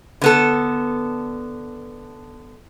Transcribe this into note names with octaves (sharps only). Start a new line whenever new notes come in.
D3 B3 A4